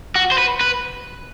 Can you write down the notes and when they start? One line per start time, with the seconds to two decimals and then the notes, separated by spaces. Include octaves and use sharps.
0.15 F#4
0.32 C5
0.38 B4
0.61 B4